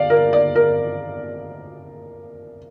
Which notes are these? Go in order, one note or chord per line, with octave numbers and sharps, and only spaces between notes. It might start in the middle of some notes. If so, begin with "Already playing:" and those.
Already playing: D5 F5
A#4
D5
A#4